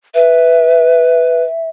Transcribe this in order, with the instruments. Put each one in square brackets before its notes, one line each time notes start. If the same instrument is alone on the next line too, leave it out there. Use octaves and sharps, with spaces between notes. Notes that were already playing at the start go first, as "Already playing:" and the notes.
[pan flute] B4 [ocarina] E5